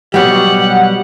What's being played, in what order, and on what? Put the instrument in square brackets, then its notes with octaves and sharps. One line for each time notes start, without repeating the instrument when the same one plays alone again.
[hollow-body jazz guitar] B2 F#3 G3 [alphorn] G4 [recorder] F#5